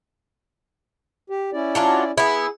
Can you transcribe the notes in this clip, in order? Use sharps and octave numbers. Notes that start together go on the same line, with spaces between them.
G4
C#4 E4 D5
F#3 D4 F4
B3 E4 G#4